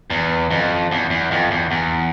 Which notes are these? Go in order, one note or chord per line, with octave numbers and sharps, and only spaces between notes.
E2
F2
E2
E2
F2
E2
E2